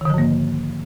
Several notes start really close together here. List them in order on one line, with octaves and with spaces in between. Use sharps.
D#3 D3 F3 G#2 A#3